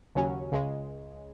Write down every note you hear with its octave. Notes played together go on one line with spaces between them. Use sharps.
D#2 C#3 F#3 C#4
C#2 C#3 G#3